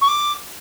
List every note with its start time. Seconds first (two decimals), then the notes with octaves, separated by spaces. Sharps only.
0.01 C#6
0.08 D6